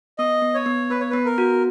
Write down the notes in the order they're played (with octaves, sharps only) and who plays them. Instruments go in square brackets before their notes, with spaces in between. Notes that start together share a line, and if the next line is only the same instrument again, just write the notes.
[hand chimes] B3 [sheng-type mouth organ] D#5
[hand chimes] B3
[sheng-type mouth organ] C#5
[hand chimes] B3
[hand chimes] B3 [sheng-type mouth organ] B4
[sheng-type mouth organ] C#5
[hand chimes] B3 [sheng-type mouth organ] B4
[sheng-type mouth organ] A#4
[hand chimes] F#4